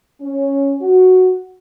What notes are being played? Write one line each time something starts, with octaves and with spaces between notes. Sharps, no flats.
C#4
F#4